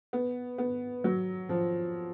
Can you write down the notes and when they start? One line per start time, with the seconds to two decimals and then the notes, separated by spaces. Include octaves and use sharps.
0.13 B3
0.58 B3
1.04 F#3
1.49 F3